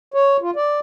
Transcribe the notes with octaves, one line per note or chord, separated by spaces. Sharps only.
C#5
F4
D5